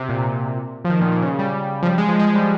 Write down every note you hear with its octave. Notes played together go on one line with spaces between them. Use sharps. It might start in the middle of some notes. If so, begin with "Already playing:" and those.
Already playing: C3
A#2
F3
D#3
A#2
A#2
C#3
G3
F3
G3
G#3
F3
G#3
G3